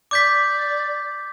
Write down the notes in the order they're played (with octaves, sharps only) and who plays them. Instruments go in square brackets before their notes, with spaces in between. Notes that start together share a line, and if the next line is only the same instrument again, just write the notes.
[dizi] D5 [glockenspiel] D6 G6 B6